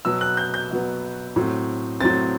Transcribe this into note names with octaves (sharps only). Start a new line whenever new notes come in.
B2 F#3 B3 E6
F#6
G6
G6
B2 F#3 B3
A2 F#3 C4
A2 F#3 C4 A6